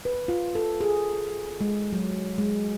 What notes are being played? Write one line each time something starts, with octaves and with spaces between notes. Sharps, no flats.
B4
F4
A4
G#4
G#3
F#3
G#3